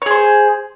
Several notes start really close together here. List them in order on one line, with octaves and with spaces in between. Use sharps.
C#5 G#4 C5